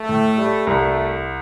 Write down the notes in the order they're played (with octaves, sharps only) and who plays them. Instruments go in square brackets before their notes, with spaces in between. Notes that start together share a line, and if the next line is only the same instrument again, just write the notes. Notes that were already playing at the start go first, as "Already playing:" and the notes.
Already playing: [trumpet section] A3
[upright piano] A2
G3
[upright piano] C2 [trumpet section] A3